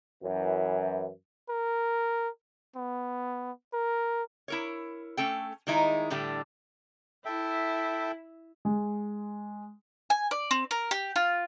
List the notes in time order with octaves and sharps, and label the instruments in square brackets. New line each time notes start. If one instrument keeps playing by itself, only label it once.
[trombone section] F#2 E3
[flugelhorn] A#4
B3
A#4
[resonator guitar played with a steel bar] E4 A#4 C#5
A3 C#4 A4 G5
D#3 G3 G#3 D#4 E4
A2 D3 G3 A3
[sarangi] E4 [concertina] A4 E5 G5
[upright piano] G#3
[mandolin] G#5
D5
C4
A#4
G4
F4